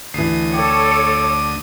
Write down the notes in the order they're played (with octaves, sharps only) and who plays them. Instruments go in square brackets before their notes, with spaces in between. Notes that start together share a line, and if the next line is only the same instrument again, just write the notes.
[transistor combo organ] D2 D#6 [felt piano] E3 C7
[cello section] A4 C#5 [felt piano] G5 [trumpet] D6